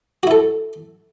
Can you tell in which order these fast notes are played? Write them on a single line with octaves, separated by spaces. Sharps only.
F#4 E4 A4